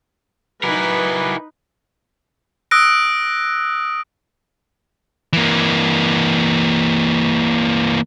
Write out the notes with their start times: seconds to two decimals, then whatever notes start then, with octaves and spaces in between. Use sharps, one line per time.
0.63 F#3 D#4 E4 A#4 B4 G#5 D6
2.71 D#6 E6 F#6 A#6 D7
5.33 E3 A#3